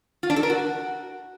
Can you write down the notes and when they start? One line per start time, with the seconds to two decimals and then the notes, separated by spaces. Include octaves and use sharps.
0.23 F4
0.30 D4
0.36 A4
0.43 A#4
0.50 F#4